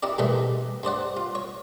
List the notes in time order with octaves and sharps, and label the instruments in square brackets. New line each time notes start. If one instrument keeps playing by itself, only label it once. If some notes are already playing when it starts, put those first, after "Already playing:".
[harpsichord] D#4 E4 G4 D5
G#2 B2 E3 G3 A3 D#4
G2 C5 D5 F#5
F4
C#5